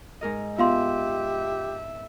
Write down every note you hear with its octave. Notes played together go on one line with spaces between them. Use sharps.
G#2 A#4 D#5
B3 F4 G4 E5 F5 C6